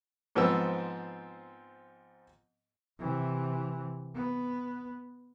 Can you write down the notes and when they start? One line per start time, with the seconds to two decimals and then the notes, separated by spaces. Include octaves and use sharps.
0.36 G#2 F3 B3 C4 E6
2.99 C3 E3
4.15 B3